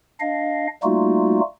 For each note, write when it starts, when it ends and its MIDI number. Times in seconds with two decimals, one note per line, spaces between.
0.20 0.67 62
0.20 0.67 75
0.20 0.67 77
0.83 1.40 55
0.83 1.40 57
0.83 1.40 58
0.83 1.40 63
0.83 1.40 65
0.83 1.40 66